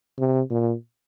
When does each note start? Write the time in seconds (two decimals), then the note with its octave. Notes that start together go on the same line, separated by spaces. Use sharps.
0.18 C3
0.51 A#2